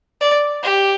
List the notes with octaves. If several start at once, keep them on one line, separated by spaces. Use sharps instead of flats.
D5
G4